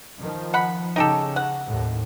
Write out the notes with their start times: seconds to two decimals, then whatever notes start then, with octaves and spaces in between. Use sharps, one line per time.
0.19 D#3 F3
0.54 F#5 B5
0.96 C#3 D#4 G4 A4
1.36 F#5
1.67 D#2 A2